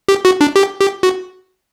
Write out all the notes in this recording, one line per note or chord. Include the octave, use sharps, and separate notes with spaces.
G4
F#4
D4
G4
G4
F#4